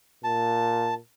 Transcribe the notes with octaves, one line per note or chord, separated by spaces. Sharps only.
A#2 A5